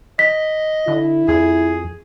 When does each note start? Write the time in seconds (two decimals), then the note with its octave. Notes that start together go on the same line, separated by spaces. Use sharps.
0.19 D#5 B6
0.88 D3 E4
1.28 F2 G#4